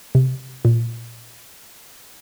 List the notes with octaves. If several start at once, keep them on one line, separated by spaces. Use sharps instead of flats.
C3
A#2